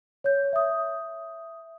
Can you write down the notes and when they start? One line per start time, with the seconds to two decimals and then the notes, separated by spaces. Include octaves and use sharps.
0.24 C#5 G6
0.53 E5 D#6